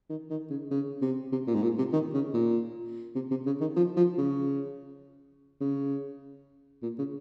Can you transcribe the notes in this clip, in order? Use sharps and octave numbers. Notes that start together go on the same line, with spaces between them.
D#3
D#3
C#3
C#3
C3
C3
A#2
G#2
A#2
C3
D#3
C#3
A#2
C3
C3
C#3
D#3
F3
F3
C#3
C#3
A#2
C#3